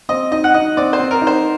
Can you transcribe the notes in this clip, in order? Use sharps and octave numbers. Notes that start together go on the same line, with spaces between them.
C4 D#5
D#4 D#5
F#5
D#4 D#5
C4 D5
C5
C4
A#4
D#4
C5